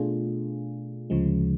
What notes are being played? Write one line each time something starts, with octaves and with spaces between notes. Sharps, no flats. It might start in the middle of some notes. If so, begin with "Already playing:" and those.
Already playing: B2 A3 D4 F4 G#4
D2 C#3 F3 G#3